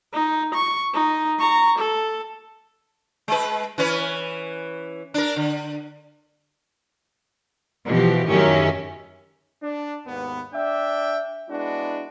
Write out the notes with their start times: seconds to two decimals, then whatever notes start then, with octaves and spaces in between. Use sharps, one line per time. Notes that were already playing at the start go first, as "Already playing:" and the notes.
0.14 D#4
0.54 C#6
0.94 D#4
1.39 A#5 C#6
1.78 A4
3.28 G#3 B4
3.78 E3 C#4 B4
5.14 D4 A#4
5.36 D3
7.88 B2 E3 F3 G4
8.28 F#2 A2 D#3 C#4 G4 E5
9.63 D4
10.06 D#2 G#2 B3
10.54 D4 D5 E5 G5
11.49 G#3 B3 D4 E4 F#4